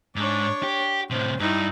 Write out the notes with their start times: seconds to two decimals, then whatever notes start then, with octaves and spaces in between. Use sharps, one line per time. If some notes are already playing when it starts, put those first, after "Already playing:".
0.16 G#2 D4 C#5
0.63 G4
1.10 A2 C3 C5
1.40 G2 D#4 E4